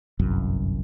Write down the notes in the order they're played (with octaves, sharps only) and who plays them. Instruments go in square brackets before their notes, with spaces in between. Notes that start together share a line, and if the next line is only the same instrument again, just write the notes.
[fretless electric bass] G1 C2 F#2